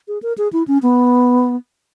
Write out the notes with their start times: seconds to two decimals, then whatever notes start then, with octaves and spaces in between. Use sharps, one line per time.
0.08 G#4
0.23 A#4
0.38 G#4
0.53 E4
0.68 C#4
0.82 B3